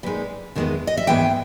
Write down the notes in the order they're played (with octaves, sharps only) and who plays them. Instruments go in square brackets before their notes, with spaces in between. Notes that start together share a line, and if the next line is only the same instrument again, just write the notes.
[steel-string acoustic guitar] A#2 G#3 D#4 B4
E2 D#3 G#3 B3
D#5
E5
G#2 E3 G#3 B3 E4 G5